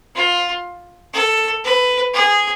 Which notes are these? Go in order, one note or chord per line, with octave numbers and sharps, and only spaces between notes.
F4
A4
B4
G#4